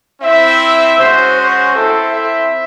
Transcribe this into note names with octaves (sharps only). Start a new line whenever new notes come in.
C4 E4 E5
G#3 C#4 F#4 C5
C5
C4 E4 A4
E5